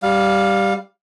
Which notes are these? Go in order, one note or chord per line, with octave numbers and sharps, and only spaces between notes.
G3 F5